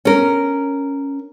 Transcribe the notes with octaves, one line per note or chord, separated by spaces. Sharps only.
C#4 A#4